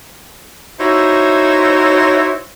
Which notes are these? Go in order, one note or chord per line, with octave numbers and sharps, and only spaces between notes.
D#4 E4 F#4 C5 C#5 E5